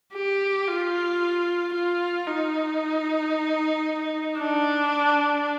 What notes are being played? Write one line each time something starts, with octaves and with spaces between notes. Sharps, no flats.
G4
F4
F4
D#4
D4